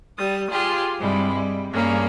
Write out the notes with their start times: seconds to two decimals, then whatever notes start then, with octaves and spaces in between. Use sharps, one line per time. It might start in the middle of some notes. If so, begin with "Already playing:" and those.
0.18 G3 D#6
0.52 F4 G4 G#4
0.99 G2 C3 G3 G#3 E4
1.36 G3
1.71 G2 G3 A#3 C#4 G#4